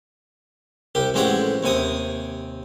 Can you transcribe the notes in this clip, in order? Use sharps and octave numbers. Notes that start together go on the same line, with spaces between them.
C2 G4
A1 F2 G#3 G4 C#5 F#5
D#2 C3 G#5 D#6